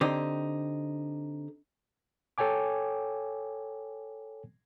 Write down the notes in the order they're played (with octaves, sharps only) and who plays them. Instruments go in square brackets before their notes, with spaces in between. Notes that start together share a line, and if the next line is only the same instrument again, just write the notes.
[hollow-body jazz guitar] D3 C4 D#4 G4
[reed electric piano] A4 C#5 G5 G#5 D6